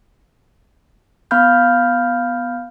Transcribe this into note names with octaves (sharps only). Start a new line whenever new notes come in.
B3 F5 B5 F6 G6